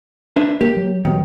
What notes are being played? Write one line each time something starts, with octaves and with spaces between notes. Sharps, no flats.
D4 B4 E5
A#3 G4
F#3
D#1 D#3 F#3 B3